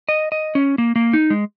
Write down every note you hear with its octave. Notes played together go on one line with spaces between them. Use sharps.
D#5
D#5
C#4
A#3
A#3
D#4
G#3